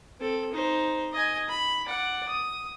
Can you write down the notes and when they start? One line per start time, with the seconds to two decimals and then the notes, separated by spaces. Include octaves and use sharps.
0.20 C4 A4
0.52 D#4 C5
1.13 D#5 G#5
1.49 B5
1.86 D5 F#5
2.28 D#6